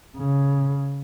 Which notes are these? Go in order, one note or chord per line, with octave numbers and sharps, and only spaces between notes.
C#3